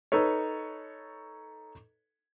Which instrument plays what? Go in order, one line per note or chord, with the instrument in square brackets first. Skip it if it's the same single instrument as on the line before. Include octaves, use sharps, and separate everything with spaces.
[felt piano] D#4 A4 B4 C#5